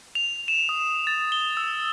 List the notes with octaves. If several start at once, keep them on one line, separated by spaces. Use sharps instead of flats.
F7
E7
D#6
A6
G7
E6